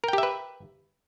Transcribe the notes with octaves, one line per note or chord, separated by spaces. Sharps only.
G4 A#4 B4 E5 G5